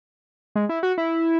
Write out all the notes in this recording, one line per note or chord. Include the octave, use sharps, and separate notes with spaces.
G#3
E4
F#4
E4